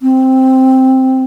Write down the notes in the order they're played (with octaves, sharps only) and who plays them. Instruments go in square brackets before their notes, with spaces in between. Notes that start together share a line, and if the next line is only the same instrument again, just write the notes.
[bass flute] C4